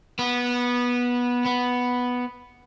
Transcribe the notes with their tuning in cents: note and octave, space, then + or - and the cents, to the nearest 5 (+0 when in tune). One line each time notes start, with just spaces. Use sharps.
B3 -15
B3 +0